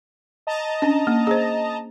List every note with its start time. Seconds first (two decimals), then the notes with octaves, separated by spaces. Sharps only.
0.47 D#5 A5 A#5
0.82 C#4 D4
1.07 A#3
1.27 G#4 C5